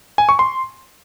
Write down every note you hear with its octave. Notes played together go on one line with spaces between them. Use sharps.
G#5
C#6
C6